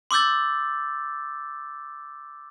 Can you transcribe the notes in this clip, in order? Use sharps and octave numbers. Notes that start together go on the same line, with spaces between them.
C6 D6 E6 G6 A6